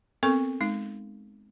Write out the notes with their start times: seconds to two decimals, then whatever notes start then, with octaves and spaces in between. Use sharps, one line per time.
0.23 B3 C4 A4 A#4 C#6
0.61 G#3 D#4